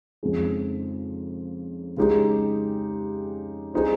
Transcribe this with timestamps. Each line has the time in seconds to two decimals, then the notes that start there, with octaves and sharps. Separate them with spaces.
0.23 F2 C#3 G#3 D#4 G#4
1.97 C#3 G#3 D#4 G4
3.74 G3 C4 D#4 G#4